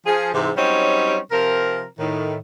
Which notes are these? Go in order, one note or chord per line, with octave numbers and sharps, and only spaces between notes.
F3 G#4
G#2 C3 E3
F#3 G3 C4 C#4 D#4 C#5
C3 F3 C4 A#4
A2 D#3